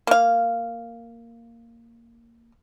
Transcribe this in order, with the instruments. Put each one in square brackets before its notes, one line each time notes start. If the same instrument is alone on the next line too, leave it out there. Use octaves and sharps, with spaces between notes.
[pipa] A#3 F5